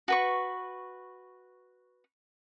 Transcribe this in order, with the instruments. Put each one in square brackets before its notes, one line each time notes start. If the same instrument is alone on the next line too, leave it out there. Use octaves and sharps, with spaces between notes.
[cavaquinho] F#4 B4 C#6